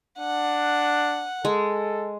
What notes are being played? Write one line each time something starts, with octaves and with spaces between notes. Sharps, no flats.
D4 F#5
G#3 A4